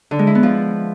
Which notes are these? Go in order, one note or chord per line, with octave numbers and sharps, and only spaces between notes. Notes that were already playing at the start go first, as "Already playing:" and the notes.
D3
G#3
E4
B3
F3